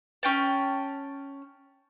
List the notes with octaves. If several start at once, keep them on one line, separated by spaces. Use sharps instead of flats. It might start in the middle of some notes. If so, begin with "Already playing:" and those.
C#4 G5 A5